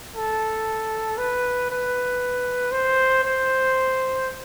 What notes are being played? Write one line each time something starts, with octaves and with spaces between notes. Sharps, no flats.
A4
B4
B4
C5
C5